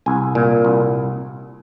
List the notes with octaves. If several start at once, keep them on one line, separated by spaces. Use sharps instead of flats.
C2 G#5
A#2
C2